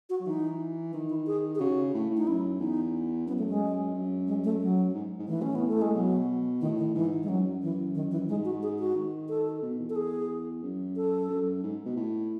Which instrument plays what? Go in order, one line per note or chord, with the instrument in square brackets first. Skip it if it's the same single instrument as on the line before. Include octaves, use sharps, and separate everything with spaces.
[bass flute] F#4
[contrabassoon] F#3
[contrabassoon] E3 [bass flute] D#4
[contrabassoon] D#3 [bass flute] D#4
[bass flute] E4
G#4
G#4
[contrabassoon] C#3 [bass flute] F#4
[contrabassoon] A2
A2
[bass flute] D#4
[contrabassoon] F#2 [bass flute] E4
[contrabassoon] E2 [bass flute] D#4
[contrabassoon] F#2 [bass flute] B3
[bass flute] A3
G#3
[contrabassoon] F#2
[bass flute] G#3
A3
F#3
[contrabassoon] G#2
G#2
[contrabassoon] A2 [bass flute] E3
[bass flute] C#4
B3
A3
G#3
[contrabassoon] B2 [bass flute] F#3
[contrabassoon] A2 [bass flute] D#3
[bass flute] D#3
[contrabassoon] G#2 [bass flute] E3
[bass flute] G#3
[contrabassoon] F#2 [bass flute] F#3
[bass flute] E3
D#3
E3
[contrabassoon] G#2 [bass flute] G#3
[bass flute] F#4
G#4
F#4
[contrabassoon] D#3
[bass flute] A4
[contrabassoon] B2
E2
[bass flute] A4
G#4
[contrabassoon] F#2
[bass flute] A4
[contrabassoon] F#2
G#2
B2
A2